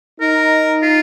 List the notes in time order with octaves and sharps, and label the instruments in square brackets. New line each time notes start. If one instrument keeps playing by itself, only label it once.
[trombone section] D#4 [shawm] A#4
[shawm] F4